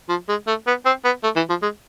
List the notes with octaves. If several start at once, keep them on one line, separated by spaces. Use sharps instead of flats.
F3
G#3
A3
B3
C4
B3
A3
E3
F3
G#3